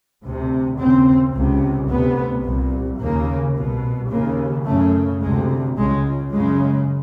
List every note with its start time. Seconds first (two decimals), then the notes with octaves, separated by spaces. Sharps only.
0.24 D2 C3
0.78 D#2 C#3 C4
1.34 C#2 C3
1.89 D2 C3 B3
2.45 C2 A#2
3.00 D#2 C#3 A#3
3.56 C2 B2
4.11 D#2 C#3 A#3
4.66 F#2 C#3 A3
5.21 D2 C3 G#3
5.77 C#2 C#3 G#3
6.32 F#2 C#3 G#3